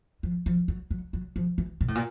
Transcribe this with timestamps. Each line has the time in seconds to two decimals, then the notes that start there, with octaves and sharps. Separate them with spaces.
0.23 F3
0.46 F3
0.68 F#3
0.91 F#3
1.13 F#3
1.36 F3
1.58 E3
1.81 A#2
1.88 A2
1.95 A#2